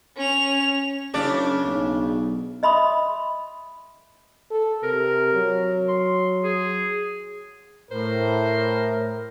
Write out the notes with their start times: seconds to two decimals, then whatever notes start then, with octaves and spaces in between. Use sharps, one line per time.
0.17 C#4 F7
1.14 F#1 C#3 D4 D5
1.64 B1
2.63 D#5 E5 B5 C6 D#6
4.51 A4
4.83 C3 A#4
5.34 F#3
5.88 C6
6.43 G#4
7.91 A2 A#4 C5